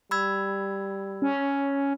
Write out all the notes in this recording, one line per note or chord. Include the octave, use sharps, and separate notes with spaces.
G3 B5 E6 G#6
C#4